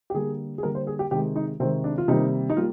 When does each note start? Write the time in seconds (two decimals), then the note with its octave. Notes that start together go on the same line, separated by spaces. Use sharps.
0.10 G4
0.14 D3 G3 A#3 G#4
0.58 G#4
0.63 D3 G3 A#3 A#4
0.75 C5
0.87 G#4
0.99 G4
1.11 C3 D#3 G#3 G4
1.36 D#4
1.60 C3 D#3 G#3 C4
1.84 D4
1.98 F4
2.08 C3 D#3 G3 A#3 D#4
2.50 D#4
2.57 G3 A#3 F4